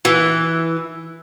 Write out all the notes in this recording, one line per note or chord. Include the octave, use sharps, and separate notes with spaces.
E3